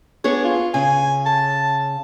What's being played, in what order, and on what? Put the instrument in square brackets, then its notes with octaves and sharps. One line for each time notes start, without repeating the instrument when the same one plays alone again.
[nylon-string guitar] B3 D4 G#4 [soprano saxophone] C#5
[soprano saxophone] F4
[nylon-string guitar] C#3 [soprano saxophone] G#5
[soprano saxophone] A5